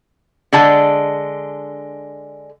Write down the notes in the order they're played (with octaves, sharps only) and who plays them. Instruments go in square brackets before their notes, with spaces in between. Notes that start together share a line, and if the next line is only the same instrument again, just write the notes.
[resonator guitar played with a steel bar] D3 G#3 A5